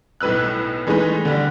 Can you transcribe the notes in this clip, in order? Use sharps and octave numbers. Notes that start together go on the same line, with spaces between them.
B1 A2 B4 E6 F#6
E3 G#3 A3 D#4 B4
D3 G3